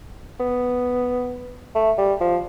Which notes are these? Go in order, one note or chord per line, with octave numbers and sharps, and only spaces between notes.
B3
A3
G3
F3